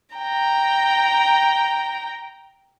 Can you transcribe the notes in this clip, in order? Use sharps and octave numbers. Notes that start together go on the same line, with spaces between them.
G5 A#5